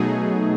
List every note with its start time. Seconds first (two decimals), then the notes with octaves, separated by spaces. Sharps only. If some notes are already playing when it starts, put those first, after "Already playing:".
Already playing: B2 F#3 A3 D#4 G#4